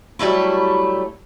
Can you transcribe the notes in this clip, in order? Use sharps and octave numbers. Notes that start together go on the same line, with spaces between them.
F#3 G3 A3 E4